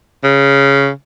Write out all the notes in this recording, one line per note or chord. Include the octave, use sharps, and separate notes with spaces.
C#3